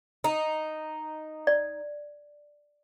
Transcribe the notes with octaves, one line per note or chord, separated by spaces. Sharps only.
D#4
D5